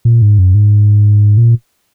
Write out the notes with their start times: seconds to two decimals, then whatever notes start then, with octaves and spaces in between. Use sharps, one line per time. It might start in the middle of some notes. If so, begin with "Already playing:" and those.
0.05 A#2
0.22 G#2
0.38 F#2
0.55 G#2
1.37 A#2